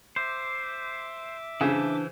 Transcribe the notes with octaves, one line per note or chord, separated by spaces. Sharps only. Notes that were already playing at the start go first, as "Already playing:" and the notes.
C5 E5 D6
C#3 E3 D4 C5